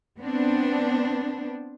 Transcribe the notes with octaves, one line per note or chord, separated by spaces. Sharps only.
B3 C4 D4